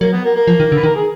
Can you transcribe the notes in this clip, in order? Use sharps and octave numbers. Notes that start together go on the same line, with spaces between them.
F#3 A#3
B3
A#3
A#3
F3
D#3
D3
B4
D#3 A#4
G#4